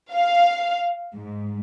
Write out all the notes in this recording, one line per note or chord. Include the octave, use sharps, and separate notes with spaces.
F5
G#2